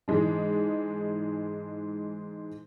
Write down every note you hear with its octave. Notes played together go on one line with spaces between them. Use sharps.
G#2 E3 G#3 D4